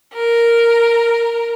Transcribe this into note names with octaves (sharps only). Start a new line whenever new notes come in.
A#4